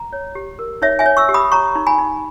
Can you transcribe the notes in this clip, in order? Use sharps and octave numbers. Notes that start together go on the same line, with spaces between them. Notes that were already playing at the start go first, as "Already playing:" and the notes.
Already playing: A#5
C#5
G4
A#4
D#4 C#5 E5
E5 G#5
C#5
C#6 E6
G4
B5 D#6
C#5 A#5 C#6
D#4
G#5 B5
D#4